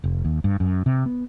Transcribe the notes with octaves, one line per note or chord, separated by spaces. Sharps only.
F1
D#2
G2
F#2
C3
B3